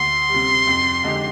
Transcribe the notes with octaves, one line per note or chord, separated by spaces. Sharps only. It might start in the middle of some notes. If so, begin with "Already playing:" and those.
Already playing: D2 C6
C3 G3
F2
D3 G#3 D#4 G4